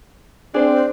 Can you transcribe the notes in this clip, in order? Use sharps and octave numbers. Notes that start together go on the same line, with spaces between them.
C4 D4 G#4 C5